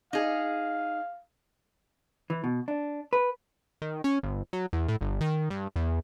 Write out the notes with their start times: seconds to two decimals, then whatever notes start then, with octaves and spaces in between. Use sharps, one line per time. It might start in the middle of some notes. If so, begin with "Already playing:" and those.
0.13 D#4 G#4 F5
2.30 E3
2.44 B2
2.68 D4
3.13 B4
3.82 D#3
4.04 C#4
4.23 G1
4.53 F#3
4.73 E2
4.88 A2
5.01 G1
5.21 D#3
5.50 G2
5.76 E2